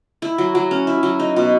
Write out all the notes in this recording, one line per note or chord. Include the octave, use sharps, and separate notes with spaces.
E4
F#3
F#3
C#4
E4
F#3
D#4
B2